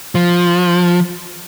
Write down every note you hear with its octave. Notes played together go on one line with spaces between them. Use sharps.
F3